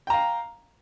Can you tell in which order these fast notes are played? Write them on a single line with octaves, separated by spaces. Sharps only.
G5 A#5 F5